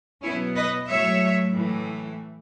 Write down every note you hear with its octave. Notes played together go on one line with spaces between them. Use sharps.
B2 F#3 B3 C#4 E4
B4 D#5
A2 F#3 A3 C#5 E5
A2 E3 A3